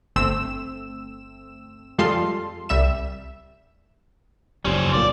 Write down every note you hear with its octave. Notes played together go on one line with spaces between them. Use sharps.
G1 A3 C4 E6 E7
F2 G3 G#3 F4 A4 C6
C2 G3 E5 E7
F#1 F2 G3 C#4 C5
B1 A#2 D5